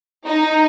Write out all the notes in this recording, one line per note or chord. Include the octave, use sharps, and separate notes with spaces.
D#4